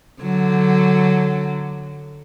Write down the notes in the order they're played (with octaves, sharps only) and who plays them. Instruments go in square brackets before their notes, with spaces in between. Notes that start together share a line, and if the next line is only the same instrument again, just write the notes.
[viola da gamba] D3 F#3